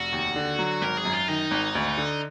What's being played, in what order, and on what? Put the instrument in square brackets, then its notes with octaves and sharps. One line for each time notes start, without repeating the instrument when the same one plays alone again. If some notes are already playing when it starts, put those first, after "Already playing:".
Already playing: [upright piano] F1 [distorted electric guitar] F#4
[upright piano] D#2
D3
F#3
[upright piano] G#1 [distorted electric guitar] A#4
[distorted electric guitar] G#4
[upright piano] F#2
[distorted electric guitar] F4
[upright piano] D#3 [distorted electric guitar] D#4
[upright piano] G#1
D2
D3